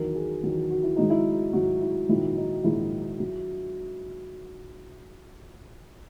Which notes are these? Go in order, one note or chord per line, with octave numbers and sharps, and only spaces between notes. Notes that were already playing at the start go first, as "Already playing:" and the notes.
Already playing: E2 D#3 F#3 A#4
G#4
E2 D#3 F#3
F#4
E4
G#1 G#2 F#3 D#4
E4
G#1 G#2 F#3 F#4
E4
A#1 G#2 D#3 F#3 E4
D#4
A#1 G#2 D#3 F#3 E4
F#3